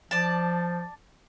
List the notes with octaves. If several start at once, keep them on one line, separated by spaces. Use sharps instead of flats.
F3 D5 A5